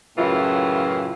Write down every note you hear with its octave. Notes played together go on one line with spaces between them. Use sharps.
F#2 A2 C#3 E3 F4